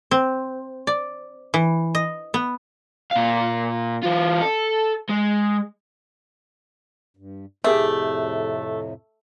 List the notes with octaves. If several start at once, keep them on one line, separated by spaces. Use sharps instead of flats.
C4
D5
E3
D#5
B3
A#2 F5
E3 F4
A4
G#3
G2
F2 A2 C3 A3 G4 G#4 E5